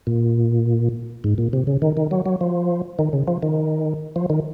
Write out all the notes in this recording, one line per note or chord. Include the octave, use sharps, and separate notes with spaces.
A#2
G#2
A#2
C3
C#3
D#3
D#3
F#3
F#3
F3
D#3
C#3
F3
D#3
F3
D#3